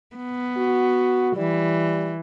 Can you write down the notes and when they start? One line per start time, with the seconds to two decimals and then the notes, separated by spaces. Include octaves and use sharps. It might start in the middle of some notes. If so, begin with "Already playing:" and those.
0.16 B3
0.57 F#4
1.36 E3 G3